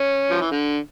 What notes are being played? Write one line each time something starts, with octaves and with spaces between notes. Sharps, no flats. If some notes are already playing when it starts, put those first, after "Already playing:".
Already playing: C#4
F3
E3
D3